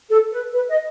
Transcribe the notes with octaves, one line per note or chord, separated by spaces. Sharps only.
A4
B4
B4
D#5